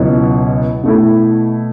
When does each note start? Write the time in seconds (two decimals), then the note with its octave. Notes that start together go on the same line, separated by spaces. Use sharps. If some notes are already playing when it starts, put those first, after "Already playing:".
Already playing: C#2 B2 F#3 B3 E4
0.83 B2 A3 E4